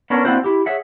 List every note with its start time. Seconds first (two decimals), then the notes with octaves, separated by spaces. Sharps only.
0.10 B3 C#4 D4 A#4 C#5
0.25 A#3 C4 D4 E4 F#4 C5
0.44 E4 G4
0.66 G#4 C#5 E5 F#5